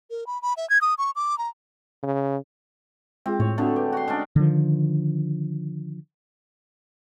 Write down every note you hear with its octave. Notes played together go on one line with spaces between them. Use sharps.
A#4
B5
B5
E5
G#6
D#6
C#6
D6
A#5
C#3
G#3 C4 F4 G#4
A2 C#5
D3 A3 C4 D4 F#4 G#4
G4 B4
F#4 C6
G#3 C#4 D4 G5
D3 D#3 F3